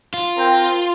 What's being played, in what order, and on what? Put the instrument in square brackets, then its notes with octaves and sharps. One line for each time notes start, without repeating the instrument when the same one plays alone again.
[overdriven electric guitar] F4
[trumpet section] C4 A#4 G5